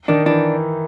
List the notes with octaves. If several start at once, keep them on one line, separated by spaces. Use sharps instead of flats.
D#3 D4 D#4
E3 D4 E4